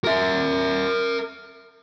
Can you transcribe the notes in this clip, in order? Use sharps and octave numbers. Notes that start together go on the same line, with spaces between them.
A#4 E5